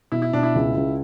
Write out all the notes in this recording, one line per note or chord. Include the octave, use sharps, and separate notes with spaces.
B2 E4
E4
B2 D4
E4
C#2
C#2